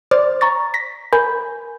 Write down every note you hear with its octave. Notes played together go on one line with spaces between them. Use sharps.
C5 D5 D6 F6 A6
A#5 C#6 A6
A#6 B6
A#4 G#5 B5 G6